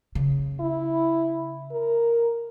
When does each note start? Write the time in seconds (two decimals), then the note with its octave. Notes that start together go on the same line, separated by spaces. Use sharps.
0.15 C#3
0.60 E4
1.71 A#4